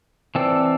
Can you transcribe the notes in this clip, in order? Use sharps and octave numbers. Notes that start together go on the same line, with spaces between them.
E3 C4 A4 D5